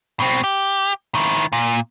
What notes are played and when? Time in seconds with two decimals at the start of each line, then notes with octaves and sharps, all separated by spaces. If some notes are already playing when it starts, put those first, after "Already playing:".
0.20 B2 C4
0.44 G4
1.15 D#3 E4
1.53 A#2